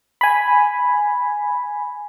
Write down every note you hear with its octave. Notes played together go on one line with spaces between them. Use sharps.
G#5 B5